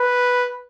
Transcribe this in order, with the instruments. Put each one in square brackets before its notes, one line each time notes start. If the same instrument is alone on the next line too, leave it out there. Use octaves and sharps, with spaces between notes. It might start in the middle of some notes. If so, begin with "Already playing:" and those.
Already playing: [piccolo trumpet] B4